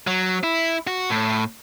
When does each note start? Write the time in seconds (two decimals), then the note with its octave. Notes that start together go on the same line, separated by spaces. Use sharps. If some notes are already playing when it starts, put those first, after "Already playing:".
0.07 F#3
0.43 E4
0.87 F#4
1.10 A2